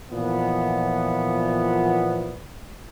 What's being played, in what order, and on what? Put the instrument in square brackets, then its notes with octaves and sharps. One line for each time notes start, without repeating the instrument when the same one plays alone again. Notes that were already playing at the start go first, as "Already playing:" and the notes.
[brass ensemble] A#2 E3 F3 B3